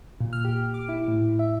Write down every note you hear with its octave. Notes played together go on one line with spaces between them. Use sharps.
A#2
F6
G4
D6
E4
A2
E5